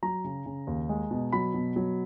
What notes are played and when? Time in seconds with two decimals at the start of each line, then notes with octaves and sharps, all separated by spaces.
0.02 F#3 A#5
0.24 C#3
0.46 C#3
0.67 D#2
0.89 G#3
1.11 B2
1.32 F#3 B5
1.54 B2
1.76 F#3